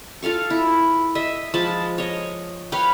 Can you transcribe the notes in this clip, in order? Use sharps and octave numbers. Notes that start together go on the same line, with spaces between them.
F4 A4 F5 C#6
E4
D#5 E5
F3 G#3 A5 B5
C#5 D#5
B4 C#5 F5 G5